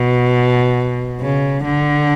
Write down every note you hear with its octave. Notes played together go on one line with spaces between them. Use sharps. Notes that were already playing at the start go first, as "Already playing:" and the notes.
Already playing: B2
C#3
D3